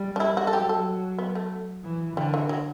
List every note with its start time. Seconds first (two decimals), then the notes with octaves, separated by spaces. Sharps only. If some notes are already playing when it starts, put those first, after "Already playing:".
Already playing: G3
0.16 D4
0.20 E4
0.37 F#4
0.47 A4
0.53 F#3 G4
0.69 A4
1.18 B3
1.35 A3
1.84 E3
2.17 D3 G3
2.34 E3
2.49 F#3